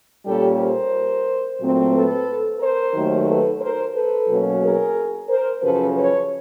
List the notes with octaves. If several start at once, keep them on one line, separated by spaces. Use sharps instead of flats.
A#2 G3 A#3 C#4 G4 A4
A#4 C5
A#2 F#3 A3 C4
A4 B4
A#4 C5
D#2 D#3 F#3 A3
A4 B4
A#4 C5
A4 B4
B2 F#3 A#3 C#4
G#4 A#4
A#4 C5
F#2 C#3 F3 A4 B4
B4 C#5